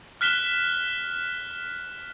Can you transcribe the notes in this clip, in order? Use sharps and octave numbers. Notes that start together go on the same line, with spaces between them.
F6 F#6 B6 E7 G7